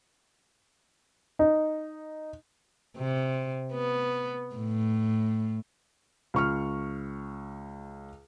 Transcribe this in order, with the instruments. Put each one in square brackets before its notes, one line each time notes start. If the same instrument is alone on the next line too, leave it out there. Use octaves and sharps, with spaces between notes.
[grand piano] D#4
[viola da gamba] C3
B3
A2
[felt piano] C#2 C#6 F6